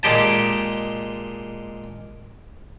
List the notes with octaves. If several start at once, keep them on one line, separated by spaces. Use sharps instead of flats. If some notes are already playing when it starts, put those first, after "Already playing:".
A#2 G#3 G4 A5